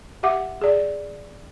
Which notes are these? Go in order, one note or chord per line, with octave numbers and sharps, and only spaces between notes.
G4 E5 F#5 D6
G#4 D5